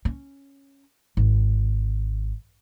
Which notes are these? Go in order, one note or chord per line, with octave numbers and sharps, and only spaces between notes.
C#4
G#1